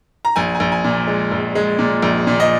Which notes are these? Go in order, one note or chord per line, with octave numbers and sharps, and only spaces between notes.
A#5
A#1 G#5
G#5
A#1
G#5
A#2
G#3
A#1
G#3
A#2
A#1
A#2
D#5